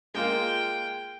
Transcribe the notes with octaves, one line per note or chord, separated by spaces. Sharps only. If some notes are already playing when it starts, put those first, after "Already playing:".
G#3 A#3 F4 G5